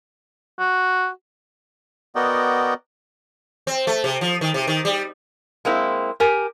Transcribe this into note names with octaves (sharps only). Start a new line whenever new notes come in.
F#4
B3 F#4 A#4 D5 D#5 G5
C4
A3
C3
F3
D#3
C3
D#3
G3
G#3 A#3 C4 E4
G4 A#4 G#5